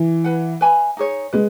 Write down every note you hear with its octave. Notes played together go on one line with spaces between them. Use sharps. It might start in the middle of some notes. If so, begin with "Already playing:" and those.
Already playing: E3
B4 F#5 B5
B4 E5 G#5 B5
D#4 G#4 C#5
G#3 B4